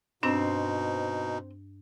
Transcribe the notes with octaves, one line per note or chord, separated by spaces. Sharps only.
G2 B2 C4 D4 D#4